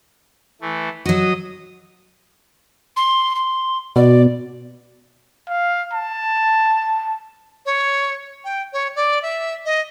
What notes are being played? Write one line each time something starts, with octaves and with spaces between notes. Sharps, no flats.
E3 A3
F#3 F#4 D#5 D#6
C6
C6
B2 D5
F5
A5
C#5
G5
C#5
D5
E5
D#5